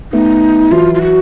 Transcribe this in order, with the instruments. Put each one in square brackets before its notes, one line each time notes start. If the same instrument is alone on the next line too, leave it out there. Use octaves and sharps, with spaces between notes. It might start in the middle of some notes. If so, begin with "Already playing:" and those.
[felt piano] A3 B3 [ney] D#4
[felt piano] E3 F#3 [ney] F4
[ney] F4
F#4